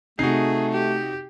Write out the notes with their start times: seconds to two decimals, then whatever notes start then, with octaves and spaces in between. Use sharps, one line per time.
0.19 C3 A3 D#4 F#4 G#4 C7
0.72 G4